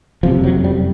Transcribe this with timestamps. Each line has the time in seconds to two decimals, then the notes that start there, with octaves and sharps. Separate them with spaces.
0.23 F#1 F2 C3 F3
0.43 F#3
0.64 G3